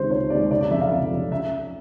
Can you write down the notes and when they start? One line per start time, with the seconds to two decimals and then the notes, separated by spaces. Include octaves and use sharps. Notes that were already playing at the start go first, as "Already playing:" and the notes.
Already playing: C#2 C3 D#3 G#3 C5
0.10 C#2 C#5
0.30 C3 D#3 G#3 D5
0.51 F1 D5
0.61 D5
0.71 F2 E5
0.74 C#3
0.81 F5
0.91 F1
1.11 F2 C#3
1.32 E5